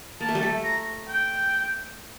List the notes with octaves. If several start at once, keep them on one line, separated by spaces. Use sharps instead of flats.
A#3 A5
A3
G3
A3
A#5
G5